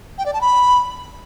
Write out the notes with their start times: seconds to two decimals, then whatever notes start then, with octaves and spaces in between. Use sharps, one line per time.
0.18 G5
0.26 D5
0.34 A5
0.41 B5